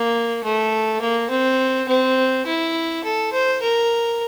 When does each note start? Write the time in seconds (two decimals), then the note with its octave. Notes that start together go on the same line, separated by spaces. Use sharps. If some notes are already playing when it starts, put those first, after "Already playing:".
Already playing: A#3
0.43 A3
1.01 A#3
1.30 C4
1.88 C4
2.46 E4
3.04 A4
3.32 C5
3.62 A#4